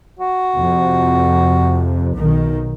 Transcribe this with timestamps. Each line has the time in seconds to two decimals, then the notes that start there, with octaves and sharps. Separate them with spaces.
0.19 F#4
0.56 F2 C3
2.16 B1 D#3